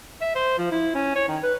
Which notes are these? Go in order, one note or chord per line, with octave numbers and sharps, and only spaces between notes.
E5
C5
F3
E4
C#4
C#5
D#3
B4